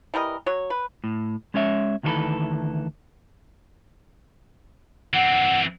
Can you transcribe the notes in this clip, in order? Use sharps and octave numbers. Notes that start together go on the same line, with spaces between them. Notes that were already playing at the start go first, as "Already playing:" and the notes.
E3 G3 A#4 D#5
F#3 C#5
B4
A2
G#3 C#4 C#5 E5
D2 D#3 E3 D#4 A4 B4
E3 C4 F#5